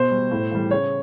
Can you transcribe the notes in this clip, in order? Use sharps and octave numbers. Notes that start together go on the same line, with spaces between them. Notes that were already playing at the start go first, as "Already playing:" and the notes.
Already playing: B2 C5
G3
A2
E3 G3
C#3 C#5